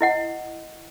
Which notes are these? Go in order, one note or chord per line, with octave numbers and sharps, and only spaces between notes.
E4 D#5 F#5